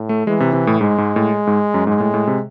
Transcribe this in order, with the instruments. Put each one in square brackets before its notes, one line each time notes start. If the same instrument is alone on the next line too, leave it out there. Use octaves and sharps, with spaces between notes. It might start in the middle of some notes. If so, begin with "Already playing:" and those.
Already playing: [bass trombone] A2
[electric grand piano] A3
[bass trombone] E3 [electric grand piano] G#3
[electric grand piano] C3
C3
A2
[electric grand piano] G#2 [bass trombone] G#3
[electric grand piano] G#2
A2
G#2
F#2
[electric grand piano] G#2 [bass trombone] G#3
[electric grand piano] A2
A2
C3